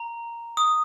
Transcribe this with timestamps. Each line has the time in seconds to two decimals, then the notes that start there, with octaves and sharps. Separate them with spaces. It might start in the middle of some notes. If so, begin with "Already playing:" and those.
Already playing: A#5
0.57 D#6